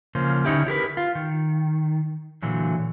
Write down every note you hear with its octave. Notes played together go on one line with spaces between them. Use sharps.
C#3 F3 A#3 C#4 C5
D3 C#4 D#4 E4 G4
E4 G4 A#4 B4
F4
D#3
A#2 D3 E3 F#3